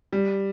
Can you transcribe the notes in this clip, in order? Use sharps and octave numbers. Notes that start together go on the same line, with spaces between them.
G3